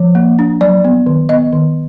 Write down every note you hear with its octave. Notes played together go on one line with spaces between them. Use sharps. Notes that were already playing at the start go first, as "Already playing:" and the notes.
Already playing: F3
A#3
D4
F#3 D5
B3
D#3
B3 D#5
D#3